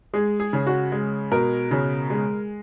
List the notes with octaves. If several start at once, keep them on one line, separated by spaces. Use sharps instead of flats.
G#3 G#4
G#4
C#3
F#4
G#3
B2 A#4
C#3
G#3